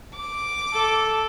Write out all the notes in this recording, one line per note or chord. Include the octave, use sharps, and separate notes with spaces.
D6
A4